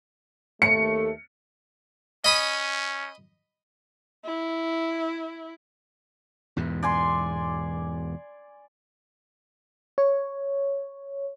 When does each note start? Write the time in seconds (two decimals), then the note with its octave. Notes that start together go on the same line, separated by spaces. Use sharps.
0.62 D#2 A3 C#7
2.24 C#4 D#5 B5 D#6
4.25 E4
6.57 E2 G#2 B2
6.83 D5 G#5 C6
9.98 C#5